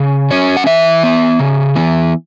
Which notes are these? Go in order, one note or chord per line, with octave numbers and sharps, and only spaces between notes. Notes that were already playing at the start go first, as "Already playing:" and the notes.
Already playing: C#3
F#3 C#4 C#5
F#5
E3 E5
B3
C#3
E3 B3